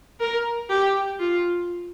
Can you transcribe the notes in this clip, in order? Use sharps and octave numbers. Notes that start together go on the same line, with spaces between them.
A#4
G4
F4